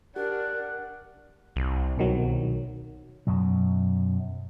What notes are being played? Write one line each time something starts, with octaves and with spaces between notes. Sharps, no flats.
D4 G4 A#4 F#5
C2
B1 D#3 F#3
F#2 B2 F#3